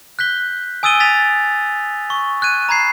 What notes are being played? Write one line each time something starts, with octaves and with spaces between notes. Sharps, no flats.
F#6 G6 B6 G7
G#5 D#6 E6 A6 D#7 G7
A6 B6 F7
C#6
F#6 G#6 D#7
A#5 B5 G#6 C7